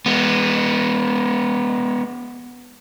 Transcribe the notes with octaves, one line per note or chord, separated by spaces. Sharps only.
G#3 B3